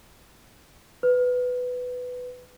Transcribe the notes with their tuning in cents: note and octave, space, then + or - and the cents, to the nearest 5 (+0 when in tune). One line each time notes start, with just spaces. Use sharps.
B4 +10